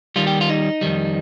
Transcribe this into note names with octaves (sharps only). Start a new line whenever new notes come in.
D#2 D#3 G3 F4
G4
F4
D#4
F2 D#3 G3